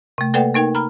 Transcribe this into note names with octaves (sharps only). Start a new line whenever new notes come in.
C3 A3
A#3 A4 B4 D5 F#5 G5
A#3 D#4 A#4 G5
A#5 B5 F6